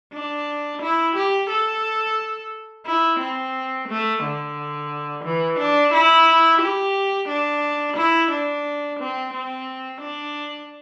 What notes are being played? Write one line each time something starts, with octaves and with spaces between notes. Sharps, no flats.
D4
E4
G4
A4
E4
C4
A3
D3
E3
D4
E4
G4
D4
E4
D4
C4
C4
D4